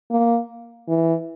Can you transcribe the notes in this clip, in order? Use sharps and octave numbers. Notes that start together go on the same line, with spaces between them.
A#3
E3